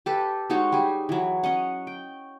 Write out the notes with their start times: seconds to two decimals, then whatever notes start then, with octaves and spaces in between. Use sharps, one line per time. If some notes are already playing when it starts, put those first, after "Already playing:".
0.06 G4 A4 B4
0.50 G#3 D#4 F#4 C#5
0.72 G3 G#4
1.09 E3 F#3
1.44 C#4 D#5 F#5
1.87 G5